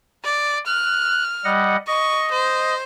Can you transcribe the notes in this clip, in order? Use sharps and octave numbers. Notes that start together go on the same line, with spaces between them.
D5
F6 F#6
G3 D#5 F#5
D#5 C#6
C5